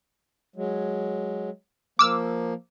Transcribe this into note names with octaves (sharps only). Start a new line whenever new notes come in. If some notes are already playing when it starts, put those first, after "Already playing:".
F#3 G#3
F3 A#3 D6 E6 F6